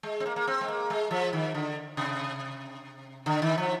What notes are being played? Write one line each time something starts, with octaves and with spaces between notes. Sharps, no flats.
G#3
C4
A#3
A#3
C4
G#3
A#3
G#3
F3
D#3
D3
C3
D3
D#3
F3